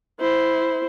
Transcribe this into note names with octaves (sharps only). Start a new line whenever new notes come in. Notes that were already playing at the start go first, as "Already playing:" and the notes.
E4 C5